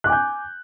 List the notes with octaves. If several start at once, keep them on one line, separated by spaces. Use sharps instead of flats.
G#5 D6 F#6 G6